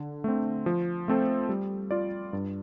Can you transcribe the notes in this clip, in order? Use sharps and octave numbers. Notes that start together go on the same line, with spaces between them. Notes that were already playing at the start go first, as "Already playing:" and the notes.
Already playing: D3
A3 C4
F3
A3 C4 A4 C5
G3
F4 D5
G2